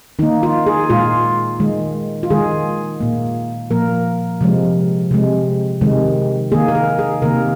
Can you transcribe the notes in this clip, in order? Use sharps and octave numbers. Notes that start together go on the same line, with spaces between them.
D#3 A#3 D#4
F4
G#4
A#2 G#3 F4
D#3 G#3
F4
D#3 G#3 G#4
A#2 A#3
A#2 F3 A#3 A#4
C3 F3 G#3
C3 G#3
C3 D#3 G#3
D#3 A#3 G#4
A#4
G#4
G#4
C3 D#3 A#3 A#4